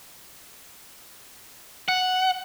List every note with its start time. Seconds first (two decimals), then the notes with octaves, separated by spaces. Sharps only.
1.88 F#5